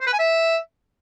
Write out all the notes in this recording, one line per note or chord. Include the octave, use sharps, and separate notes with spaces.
C5
B4
G#5
E5